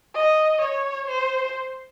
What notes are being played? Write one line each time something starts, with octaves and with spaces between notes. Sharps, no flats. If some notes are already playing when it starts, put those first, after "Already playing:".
D#5
C#5
C5